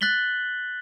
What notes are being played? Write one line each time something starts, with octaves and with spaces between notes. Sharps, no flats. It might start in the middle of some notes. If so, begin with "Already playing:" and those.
F#6 A6 B6 F#7 G7